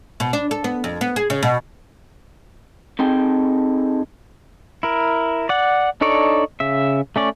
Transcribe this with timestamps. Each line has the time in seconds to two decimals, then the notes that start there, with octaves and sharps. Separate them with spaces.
0.20 B2
0.33 D4
0.51 A4
0.64 B3
0.84 F2
1.01 B3
1.16 G#4
1.30 C#3
1.43 B2
2.99 C4 D#4 G#4 A4 G5
4.83 E4 A#4
5.49 D5 F#5
6.01 D4 D#4 A4 C#5 D5
6.60 C#3 E5
7.16 A3 C#4 D5